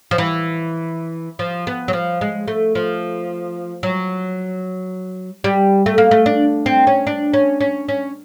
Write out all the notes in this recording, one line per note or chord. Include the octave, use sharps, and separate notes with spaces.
F3
E3
F3
B3
F#3
F3
G#3
A3
F3
F#3
G3
A3
A#3
A3
D4
C4
C#4
D4
C#4
C#4
C#4